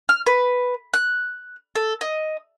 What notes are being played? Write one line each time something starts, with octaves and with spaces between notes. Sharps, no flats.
F6
B4
F#6
A4
D#5